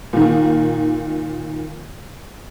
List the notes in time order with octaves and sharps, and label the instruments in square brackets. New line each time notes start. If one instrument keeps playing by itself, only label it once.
[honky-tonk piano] A#2 D#3